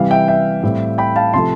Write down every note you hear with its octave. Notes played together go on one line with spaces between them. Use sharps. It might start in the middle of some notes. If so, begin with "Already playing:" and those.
Already playing: C3 E3 G3 F5
E5 G5
E5 G5
A2 G3 C4
G5 B5
F5 A5
C3 F3 A3 A5 C6